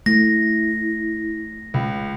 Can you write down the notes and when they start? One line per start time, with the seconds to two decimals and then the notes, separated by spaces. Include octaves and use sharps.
0.06 A3 E4 A#6
1.74 C#2